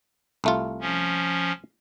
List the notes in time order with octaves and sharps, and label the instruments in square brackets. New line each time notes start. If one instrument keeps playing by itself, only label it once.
[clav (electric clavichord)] C2 A3 F4
[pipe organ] F3 C#4